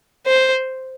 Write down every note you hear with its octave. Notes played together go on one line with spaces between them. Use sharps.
C5